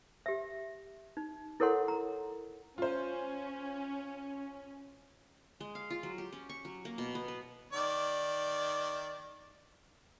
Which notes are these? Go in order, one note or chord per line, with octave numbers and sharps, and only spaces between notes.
G4 E5
D#4
E4 A4 A#4 C#5 F#5 C6
A#5
C#4 F4 C5
G#3
F5
F4
F#3
G4
C#4
C#6
F#3
A#3
B2
B3
B4
D#3 D5